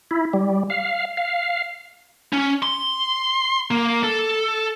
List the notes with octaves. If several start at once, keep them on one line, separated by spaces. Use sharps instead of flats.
E4
G3
F5
F5
C#4
C6
A#3
A4